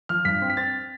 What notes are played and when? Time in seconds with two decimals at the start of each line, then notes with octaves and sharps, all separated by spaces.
0.09 F3 F6
0.25 G2 B6
0.42 C4
0.50 B6
0.57 C4 A6